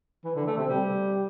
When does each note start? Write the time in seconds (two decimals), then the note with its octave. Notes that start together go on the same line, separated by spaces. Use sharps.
0.25 E3
0.36 D3
0.47 A3
0.58 C3
0.69 G3